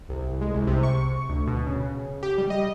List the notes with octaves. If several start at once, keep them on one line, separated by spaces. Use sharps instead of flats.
C2
G#3
C2
C3
C#6
D2
B2
C#3
G4
G3
D#5